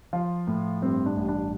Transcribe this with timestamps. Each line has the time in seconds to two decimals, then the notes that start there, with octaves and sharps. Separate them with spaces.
0.13 F3 F4
0.47 A2
0.82 G2 C4
1.06 D4
1.17 A1
1.28 D4